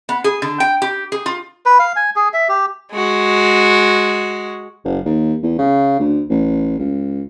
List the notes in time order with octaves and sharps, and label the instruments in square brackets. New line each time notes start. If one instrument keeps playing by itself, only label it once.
[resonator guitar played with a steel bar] B3
G#4
D3
G5
G4
G#4
F4
[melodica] B4
F5
G#5
G#4
E5
G4
[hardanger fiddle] G#3 F#4
[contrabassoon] F#1
D#2
E2
C#3
D2
A1
C#2